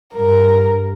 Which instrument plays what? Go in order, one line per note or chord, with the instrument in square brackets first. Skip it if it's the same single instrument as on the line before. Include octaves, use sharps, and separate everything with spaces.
[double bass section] G2 [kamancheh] A#4